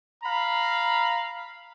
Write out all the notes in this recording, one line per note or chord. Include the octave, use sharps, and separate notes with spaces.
F5 A#5 B5